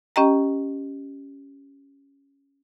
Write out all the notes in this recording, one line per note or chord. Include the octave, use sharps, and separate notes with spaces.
C#4 G4 D#5 G5 A#5